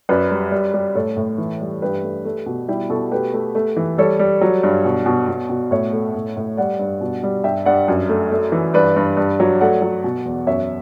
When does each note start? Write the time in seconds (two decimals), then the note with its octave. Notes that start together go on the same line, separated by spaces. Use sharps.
0.09 F#2 B4 D5
0.31 G3
0.51 G3
0.74 G3
0.95 A2 A4 C#5
1.17 A2
1.38 E3
1.61 G3
1.82 G2 G4 B4
2.03 A3
2.25 A3
2.46 B2
2.68 G3 E4 G4
2.90 B2 F#4 A4
3.12 A3 G4 B4
3.34 A3
3.55 A3
3.77 E3
3.98 G3 A4 C#5
4.19 G3
4.41 F#3
4.63 G2
4.85 B2
5.06 B2
5.28 B2
5.50 B2
5.71 A2 C#5 E5
5.93 A3
6.15 A2
6.37 A2
6.57 G3 D5 F#5
6.79 G2
7.01 B2
7.23 G3
7.44 G2 E5 G5
7.66 G2 D5 F#5
7.88 F#2
8.09 A3
8.31 A3
8.52 E3
8.74 G2 B4 D5
8.97 G2
9.17 G2
9.40 F#3
9.61 A3 D5 F#5
9.82 F#3
10.04 B2
10.25 E2
10.47 F#2 C#5 E5